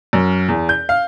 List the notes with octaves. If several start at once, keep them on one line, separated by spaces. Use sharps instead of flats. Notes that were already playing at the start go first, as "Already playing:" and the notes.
F#2
E2
G6
F5